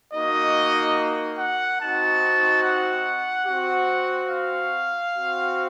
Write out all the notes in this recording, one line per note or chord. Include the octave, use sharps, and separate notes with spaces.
A#3 D#4 F#4 D#5
F#5
C4 D#4 F#4 A5
F#5
C4 F#4
F5
C4 F#4